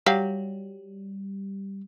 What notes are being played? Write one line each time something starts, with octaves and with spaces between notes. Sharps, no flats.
F#3 G3 G4 F5